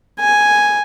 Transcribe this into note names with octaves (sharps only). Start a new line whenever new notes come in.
G#5